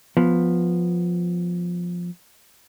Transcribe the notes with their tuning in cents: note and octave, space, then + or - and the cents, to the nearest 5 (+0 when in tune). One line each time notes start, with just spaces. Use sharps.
F3 +10 B3 +0